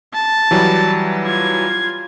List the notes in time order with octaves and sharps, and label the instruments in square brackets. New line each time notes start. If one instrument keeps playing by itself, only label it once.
[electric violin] A5
[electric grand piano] E3 F#3 G3
[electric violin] F4 G#6